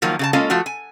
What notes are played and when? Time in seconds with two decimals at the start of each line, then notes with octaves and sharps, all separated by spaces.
0.02 D#3 F3 F#3 A#3
0.19 C#3 G#4 A5
0.33 G#3 A#3 C#4 F4 A4 F5
0.50 F3 A3 F4 F#4
0.66 G#5